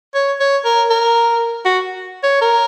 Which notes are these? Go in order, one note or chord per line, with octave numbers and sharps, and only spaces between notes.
C#5
C#5
A#4
A#4
F#4
C#5
A#4